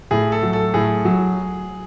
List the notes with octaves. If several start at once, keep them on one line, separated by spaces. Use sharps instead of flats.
A2 G#4
A4
F#3
A4
A2 G#4
F#3